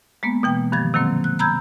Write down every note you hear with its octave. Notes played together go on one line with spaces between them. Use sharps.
G#3 A#3 B3
B2 E3 G5
G2 D#3 F3 G#6 A6
C3 D#3 F#3 A#3 C4
F#6
A#5 B5 E6 G6 G#6